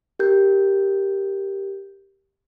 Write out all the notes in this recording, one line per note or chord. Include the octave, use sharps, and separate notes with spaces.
G4 A#4 G6